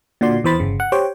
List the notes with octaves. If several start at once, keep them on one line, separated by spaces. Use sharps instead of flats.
A#2 D3 F#4 D5 C6
E2 E3 C5 B5 A6
G1 C#3
F#5
G4 C5 C#5 G5